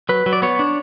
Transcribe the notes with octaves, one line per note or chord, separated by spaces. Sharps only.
F#3 B4
F#3
D5
B3 C#5
D4